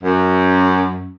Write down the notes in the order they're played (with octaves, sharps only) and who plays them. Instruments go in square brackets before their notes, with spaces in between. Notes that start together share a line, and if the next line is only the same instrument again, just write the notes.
[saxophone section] F#2